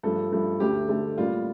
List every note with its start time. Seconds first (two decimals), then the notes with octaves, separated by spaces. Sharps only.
0.03 G2 F3 A3 A4
0.32 G2 F3 A3
0.60 D2 D3 A3 G4
0.88 D2 D3 A3
1.18 A2 G3 A#3 F4